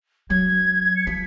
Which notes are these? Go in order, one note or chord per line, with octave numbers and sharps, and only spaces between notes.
F#3 G#6
C#7
F3 B6